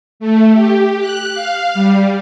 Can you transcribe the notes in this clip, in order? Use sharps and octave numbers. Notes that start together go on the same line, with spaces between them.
A3
G4
F#6
F5
G3